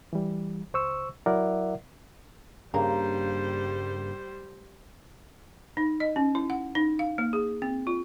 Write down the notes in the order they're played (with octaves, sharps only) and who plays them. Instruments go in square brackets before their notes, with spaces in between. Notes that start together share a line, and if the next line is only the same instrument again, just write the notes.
[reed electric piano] E3 G3
C#2 C5 C#6 E6
F#3 E4 A#4 D5 E5 F#5
[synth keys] G2 C#3 A#3 [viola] G3 C5 [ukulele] A#5
[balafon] D#4
D#5
C#4
E4
F#5
D#4
F5
A#3
G#4
C4
F4